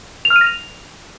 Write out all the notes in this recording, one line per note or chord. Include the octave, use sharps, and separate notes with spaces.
F7
F6
D#7
A#6
F7